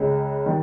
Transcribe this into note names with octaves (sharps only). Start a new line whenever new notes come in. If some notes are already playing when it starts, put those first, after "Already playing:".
Already playing: C#2 C#3 G#3
D#3 G3